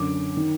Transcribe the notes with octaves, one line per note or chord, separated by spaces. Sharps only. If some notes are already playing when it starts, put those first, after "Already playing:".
Already playing: F#2 D3 D6
D#3